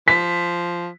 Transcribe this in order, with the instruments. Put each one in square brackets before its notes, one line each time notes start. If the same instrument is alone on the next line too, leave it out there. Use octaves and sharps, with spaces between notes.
[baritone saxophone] F3 [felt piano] B6